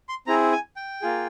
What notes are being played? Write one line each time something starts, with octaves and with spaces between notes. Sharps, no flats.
C6
C4 E4 G#4 A#5
G#5
G5
A#3 F4 G#4